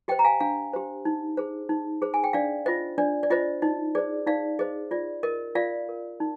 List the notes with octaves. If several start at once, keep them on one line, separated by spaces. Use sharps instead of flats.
G4 C5 D#5 G5
A#5
F5 G#5
D4 F5 G#5
G4 C5
D#4
G#4 C5
D#4
G#4 C5
G#5
G5
D4 D5 F5
F4 C5 D#5
D4 D5
D5
F4 C5 D#5
D#4 D#5
G#4 C5 D5
D#4 D5 F5
G#4 C5 D#5
F4 D5
A#4 D#5
F4 D5 F5
A#4
D#4